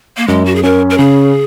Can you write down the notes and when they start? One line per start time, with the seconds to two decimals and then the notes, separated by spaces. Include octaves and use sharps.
0.17 A#3
0.28 F#2 G#3
0.46 F#4
0.55 G#4
0.63 C#4 A#4
0.90 A#4
0.98 C#3 G#4